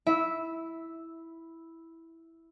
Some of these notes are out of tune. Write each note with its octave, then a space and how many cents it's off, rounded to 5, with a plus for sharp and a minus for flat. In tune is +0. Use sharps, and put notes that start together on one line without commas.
E4 -5 E5 -20